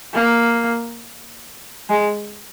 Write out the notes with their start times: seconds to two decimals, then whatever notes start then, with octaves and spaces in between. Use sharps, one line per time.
0.14 A#3
1.90 G#3